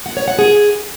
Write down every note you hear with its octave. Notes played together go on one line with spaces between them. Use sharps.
F#5
C#5
F#5
G#4